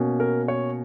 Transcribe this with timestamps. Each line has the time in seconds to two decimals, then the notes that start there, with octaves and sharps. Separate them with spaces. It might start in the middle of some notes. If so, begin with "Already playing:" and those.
Already playing: B2 A#3 C#4
0.20 A#4
0.48 C#5